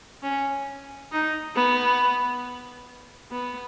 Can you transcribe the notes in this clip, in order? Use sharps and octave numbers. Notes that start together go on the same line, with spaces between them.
C#4
D#4
B3
B3